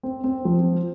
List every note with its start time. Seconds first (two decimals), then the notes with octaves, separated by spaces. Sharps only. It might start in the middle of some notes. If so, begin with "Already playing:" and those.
0.03 C4
0.24 C4
0.45 F3